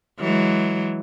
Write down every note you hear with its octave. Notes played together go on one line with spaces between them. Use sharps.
E3 F#3 G#3